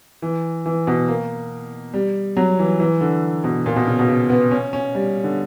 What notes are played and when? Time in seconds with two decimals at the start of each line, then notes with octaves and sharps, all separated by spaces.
0.22 E3
0.66 E3
0.87 B2
1.08 A#3
1.94 G3
2.37 F#3
2.59 E3
2.80 E3
3.01 D3
3.44 B2
3.66 A#2
3.76 B2
3.87 C#3
3.99 B2
4.08 C#3
4.30 B3
4.51 C#4
4.73 C#4
4.95 G3
5.24 D3